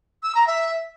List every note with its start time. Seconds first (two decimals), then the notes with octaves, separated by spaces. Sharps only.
0.23 E6
0.35 A#5
0.47 E5